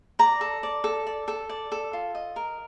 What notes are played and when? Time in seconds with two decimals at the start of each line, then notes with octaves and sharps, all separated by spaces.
0.19 D5 A#5
0.41 A4
0.63 D5
0.84 A4
1.07 D5
1.28 A4
1.49 D5
1.72 A4
1.93 F4
2.15 D#5
2.36 A#4